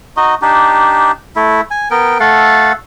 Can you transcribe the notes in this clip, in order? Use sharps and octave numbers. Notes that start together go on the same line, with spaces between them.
D#4 F#4 D#5
D4 D#4 G4
A3 E4
G#5
B3 A#4 G5
A3 A4 F5 F#5